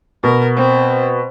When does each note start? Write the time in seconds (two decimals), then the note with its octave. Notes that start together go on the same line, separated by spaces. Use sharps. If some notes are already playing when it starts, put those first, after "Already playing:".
0.24 B2 A#4
0.56 C4